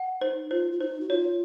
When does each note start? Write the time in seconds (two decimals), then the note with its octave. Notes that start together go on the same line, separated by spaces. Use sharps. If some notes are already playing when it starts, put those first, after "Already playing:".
Already playing: F#5
0.21 D#4 C5
0.50 F4 C5
0.72 F4
0.80 D#4 C5
1.01 F#4
1.10 F4 C#5